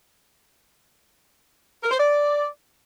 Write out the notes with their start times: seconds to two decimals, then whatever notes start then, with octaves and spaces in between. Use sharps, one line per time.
1.83 A#4
1.91 C5
1.98 D5